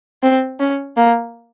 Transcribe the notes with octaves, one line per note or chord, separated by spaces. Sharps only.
C4
C#4
A#3